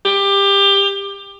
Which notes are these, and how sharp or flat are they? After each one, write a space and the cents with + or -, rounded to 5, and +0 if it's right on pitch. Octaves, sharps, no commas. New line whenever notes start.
G4 +20